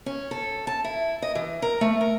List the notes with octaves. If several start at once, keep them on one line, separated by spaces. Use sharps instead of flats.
C#4
A4
A5
E4
D#5
E3
A#4
A3
A#4